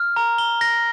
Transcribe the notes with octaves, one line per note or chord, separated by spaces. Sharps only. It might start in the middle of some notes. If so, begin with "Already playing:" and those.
Already playing: F6
A#5
G7
A#6